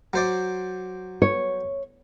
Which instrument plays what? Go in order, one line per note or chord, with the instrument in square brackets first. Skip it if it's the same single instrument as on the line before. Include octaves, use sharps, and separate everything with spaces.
[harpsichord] F#3 C5 D5
[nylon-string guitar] C#5